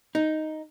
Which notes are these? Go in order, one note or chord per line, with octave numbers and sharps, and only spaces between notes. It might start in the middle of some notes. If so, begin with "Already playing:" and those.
D#4